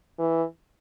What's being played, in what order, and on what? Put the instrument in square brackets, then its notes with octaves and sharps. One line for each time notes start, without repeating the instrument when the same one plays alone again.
[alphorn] E3